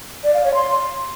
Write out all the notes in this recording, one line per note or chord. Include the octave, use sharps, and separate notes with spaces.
D5
F5
C#5
C6